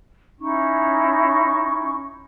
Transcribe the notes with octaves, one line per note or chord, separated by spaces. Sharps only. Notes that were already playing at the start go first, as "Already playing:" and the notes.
C#4 D#4 E4 C#6